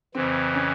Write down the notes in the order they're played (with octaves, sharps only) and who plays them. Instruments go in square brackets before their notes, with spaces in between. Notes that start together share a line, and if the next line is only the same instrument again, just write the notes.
[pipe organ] F2 C#3 E3 [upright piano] C4
[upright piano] C#4